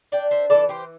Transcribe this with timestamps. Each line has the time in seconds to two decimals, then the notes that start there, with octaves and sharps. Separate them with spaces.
0.12 D4 D5 G5
0.31 C5 E5
0.50 E3 A4 D5
0.69 G4 C5